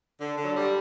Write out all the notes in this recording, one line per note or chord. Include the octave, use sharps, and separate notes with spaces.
D3
D3
F#3
D3 G3